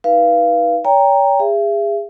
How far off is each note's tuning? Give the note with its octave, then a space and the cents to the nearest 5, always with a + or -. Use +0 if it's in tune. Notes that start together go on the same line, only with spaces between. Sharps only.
D#4 +25 B4 -20 F5 -20
C#5 +40 G5 +20 A#5 +0
G#4 -30 E5 +35